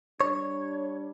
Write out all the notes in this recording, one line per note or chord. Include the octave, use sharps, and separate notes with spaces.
G3 D4 C#5